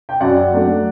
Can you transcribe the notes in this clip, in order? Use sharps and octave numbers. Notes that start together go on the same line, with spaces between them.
G5
F#2 D5 F#5
F#3 A3 D4